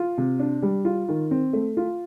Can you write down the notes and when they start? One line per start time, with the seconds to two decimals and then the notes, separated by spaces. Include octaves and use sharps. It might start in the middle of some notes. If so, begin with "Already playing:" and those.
Already playing: F4
0.18 C3
0.39 D4
0.62 G3
0.85 F4
1.08 D#3
1.31 C4
1.53 A3
1.77 F4